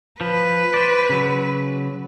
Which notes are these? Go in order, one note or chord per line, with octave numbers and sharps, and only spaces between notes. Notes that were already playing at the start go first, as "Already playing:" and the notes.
F3 B4
C5 D5
C#3 F#3